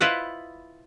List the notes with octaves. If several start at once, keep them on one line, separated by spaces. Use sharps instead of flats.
E4 F4 B4 C5 D#5 F#5